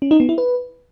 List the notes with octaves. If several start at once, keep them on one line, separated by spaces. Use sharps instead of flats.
C#4
D#4
B3
E4
B4